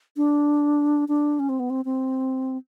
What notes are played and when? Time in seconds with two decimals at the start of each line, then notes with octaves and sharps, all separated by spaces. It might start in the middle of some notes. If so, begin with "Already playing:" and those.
0.17 D4
1.08 D4
1.39 C#4
1.49 C4
1.60 B3
1.70 C4
1.85 C4